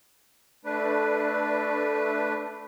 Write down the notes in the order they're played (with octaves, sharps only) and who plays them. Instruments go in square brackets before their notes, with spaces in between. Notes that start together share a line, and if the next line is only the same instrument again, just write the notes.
[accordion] A3 D4 B4